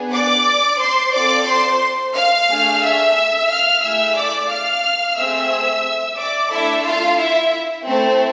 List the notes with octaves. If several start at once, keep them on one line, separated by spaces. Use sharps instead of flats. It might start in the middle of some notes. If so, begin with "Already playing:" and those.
Already playing: B3 D4 G#4
D5 D6
C5 C6
C4 F4 A4 D5 D6
C5 C6
F5 F6
A3 D4 G#4
E5 E6
F5 F6
A3 E4 G#4 E5 E6
D5 D6
F5 F6
A3 C4 G#4 E5 E6
D5 D6
A3 D4 E4 A4 E5
F4 F5
E4 E5
A3 C4 E4 A4 C5